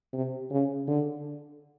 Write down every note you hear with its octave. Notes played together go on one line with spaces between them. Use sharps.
C3
C#3
D3